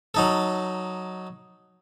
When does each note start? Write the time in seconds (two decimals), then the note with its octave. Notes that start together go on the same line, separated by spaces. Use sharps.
0.14 F#3 D#4 A4